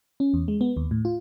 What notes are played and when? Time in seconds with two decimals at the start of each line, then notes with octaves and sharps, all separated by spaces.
0.20 C#4
0.34 E2
0.48 G#3
0.61 B3
0.77 D#2
0.91 A2
1.05 F4